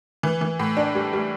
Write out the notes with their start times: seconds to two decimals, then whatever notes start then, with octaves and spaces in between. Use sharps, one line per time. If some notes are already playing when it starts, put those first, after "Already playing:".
0.23 E3
0.41 E3
0.59 A2
0.77 D4
0.95 G3
1.13 G3